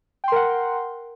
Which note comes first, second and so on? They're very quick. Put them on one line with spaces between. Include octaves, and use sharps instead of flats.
G5 C6 A#4 F#5